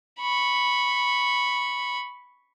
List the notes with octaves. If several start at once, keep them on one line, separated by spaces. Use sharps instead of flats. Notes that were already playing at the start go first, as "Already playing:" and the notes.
B5 C#6